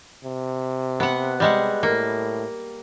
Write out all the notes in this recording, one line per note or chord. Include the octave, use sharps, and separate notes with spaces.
C3
B3 F#5
G3 G#3 F#5
A2 A#3